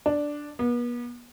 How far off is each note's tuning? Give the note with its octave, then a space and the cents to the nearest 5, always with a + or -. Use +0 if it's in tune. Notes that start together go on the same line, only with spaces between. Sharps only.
D4 +0
B3 -40